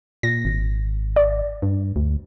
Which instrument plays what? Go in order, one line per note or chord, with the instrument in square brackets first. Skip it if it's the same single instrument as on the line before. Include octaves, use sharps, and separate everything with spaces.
[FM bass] A#2 [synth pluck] A#6
[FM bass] G#1
[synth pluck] D5
[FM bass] G2
D2